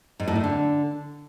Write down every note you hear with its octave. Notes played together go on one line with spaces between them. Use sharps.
G#2
A2
G#2
D3